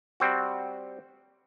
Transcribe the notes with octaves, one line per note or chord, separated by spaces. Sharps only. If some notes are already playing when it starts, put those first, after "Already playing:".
G3 C4 F#4